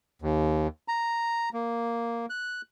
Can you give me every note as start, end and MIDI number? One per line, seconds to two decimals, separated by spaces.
0.22 0.68 39
0.88 1.49 82
1.53 2.26 58
2.30 2.62 90